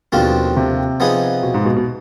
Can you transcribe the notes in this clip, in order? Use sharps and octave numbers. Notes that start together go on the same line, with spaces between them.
D#2 B2 D3 F3 C4 F4
C3
F3 B3 D#4 G#4
B2
G#2
B2
B2